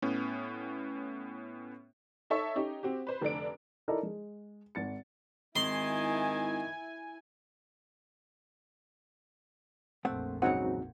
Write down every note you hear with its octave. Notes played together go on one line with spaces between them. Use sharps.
A2 B3 C#4
D#4 A4 C#5 E5 A5 C#6
C#4 D#4 G4
C4 F#4 G4
B4 C5
F1 D3 D4 D7
D#4 E4 A4 A#4 D5 D#5
G#3
G#1 A6 C#7
G#1 D#3 E4 G#5 C6
A#1 F2 A3 C4 F#5
G#2 C#3 F#3 C4 D#4 F#4 F#5